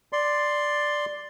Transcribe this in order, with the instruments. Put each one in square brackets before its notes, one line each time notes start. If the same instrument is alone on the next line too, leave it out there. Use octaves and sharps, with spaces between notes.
[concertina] D5 C6